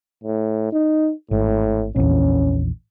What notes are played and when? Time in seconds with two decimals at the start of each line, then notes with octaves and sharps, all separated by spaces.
0.24 A2
0.73 D#4
1.31 G#1 A2
1.96 A#1 E2 C#4